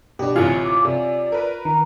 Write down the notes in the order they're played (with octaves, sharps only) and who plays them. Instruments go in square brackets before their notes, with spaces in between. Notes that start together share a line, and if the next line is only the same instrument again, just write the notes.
[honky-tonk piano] B2 [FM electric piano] D4 G4
[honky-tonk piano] A1 C3 E3 [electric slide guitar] F4 C#5 [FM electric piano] F5 G#5
[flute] D6
[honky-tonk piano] C3 [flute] D5
[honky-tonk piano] A#4 B4
[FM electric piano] D#3 [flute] A#5